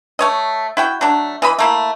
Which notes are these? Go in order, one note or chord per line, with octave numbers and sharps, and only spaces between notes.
A3 C#5 D#5
E4 F#4 G5
F#3 A3 D4
E3 D#5 B5
A3 A#3 E4